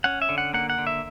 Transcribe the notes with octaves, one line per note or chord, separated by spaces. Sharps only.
C#4 F#5
E5
D3
F#5
A#3 F#5
F#5
D3
E5